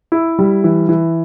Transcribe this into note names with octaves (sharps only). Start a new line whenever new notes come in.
E4
G3
E3
E3